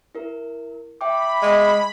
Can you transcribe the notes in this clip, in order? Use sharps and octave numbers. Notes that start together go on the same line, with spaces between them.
E4 A#4
E5 G5 B5 D6
G#3